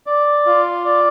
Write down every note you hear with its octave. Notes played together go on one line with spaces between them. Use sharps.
D5
F4
D5